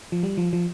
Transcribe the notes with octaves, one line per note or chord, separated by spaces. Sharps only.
F3
G3
F3
F3